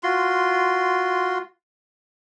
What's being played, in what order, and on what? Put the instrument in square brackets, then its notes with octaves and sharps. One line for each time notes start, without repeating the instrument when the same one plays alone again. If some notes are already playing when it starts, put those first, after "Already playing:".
[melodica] F4 F#4 C6